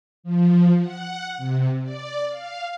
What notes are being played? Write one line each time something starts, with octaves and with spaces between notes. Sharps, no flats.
F3
F#5
C3
D5
F5